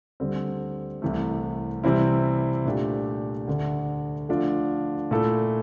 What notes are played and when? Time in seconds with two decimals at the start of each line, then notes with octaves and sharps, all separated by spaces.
0.20 D2 D3 G3 C4
1.02 C2 C3 E3 A3
1.84 C3 E3 G3 C4 E4
2.65 A#2 A3 D4 G4
3.47 D2 D3 A3 D4
4.29 D3 F3 A3 D4 F4
5.11 A#2 A3 E4 A4